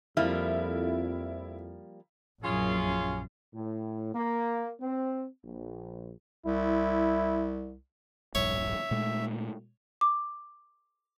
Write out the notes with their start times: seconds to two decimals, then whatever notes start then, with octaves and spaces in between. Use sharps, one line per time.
0.17 F2 F3 G3 A#3 E4
2.43 A#1 F#2 C#4 F4 G#4
3.54 A2
4.15 A#3
4.81 C4
5.44 A#1
6.46 C2 E4
8.35 D1 A#1 G2 C#5 E5
8.91 A#2 G#3 A3
10.01 D6